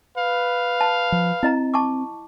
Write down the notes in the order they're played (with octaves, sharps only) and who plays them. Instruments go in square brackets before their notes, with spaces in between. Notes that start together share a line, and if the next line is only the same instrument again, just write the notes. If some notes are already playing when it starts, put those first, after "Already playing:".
[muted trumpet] B4 [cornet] F5
[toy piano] A5
[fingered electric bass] F3
[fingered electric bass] C4 [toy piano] E4 D#5 A#5
[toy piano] A5 C#6 D6